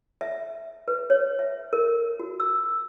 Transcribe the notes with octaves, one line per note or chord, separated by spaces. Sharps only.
E5
B4
C#5
E5
A#4
F#4
E6